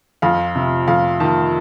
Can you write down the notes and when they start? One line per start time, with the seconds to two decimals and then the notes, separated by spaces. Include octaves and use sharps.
0.22 F2 F5
0.55 C3
0.88 F2 F5
1.20 D#3 A5